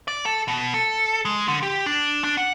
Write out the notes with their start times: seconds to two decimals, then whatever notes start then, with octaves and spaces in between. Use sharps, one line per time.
0.08 D5
0.26 A4
0.48 B2
0.74 A4
1.25 G#3
1.48 D3
1.63 G4
1.86 D4
2.24 D4
2.38 F#5